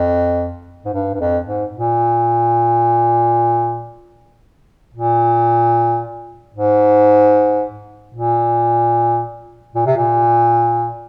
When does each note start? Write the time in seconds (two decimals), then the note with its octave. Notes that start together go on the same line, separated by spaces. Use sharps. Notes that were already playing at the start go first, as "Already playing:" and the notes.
Already playing: F2
0.85 G#2
0.93 G2
1.14 G2
1.20 F2
1.46 G#2
1.74 A#2
4.94 A#2
6.54 G#2
8.14 A#2
9.75 A#2
9.86 C3
9.97 A#2